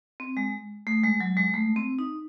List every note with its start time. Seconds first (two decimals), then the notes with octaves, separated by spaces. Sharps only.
0.20 C4
0.37 G#3
0.87 A3
1.04 G#3
1.20 F#3
1.37 G#3
1.54 A3
1.76 C4
1.99 D#4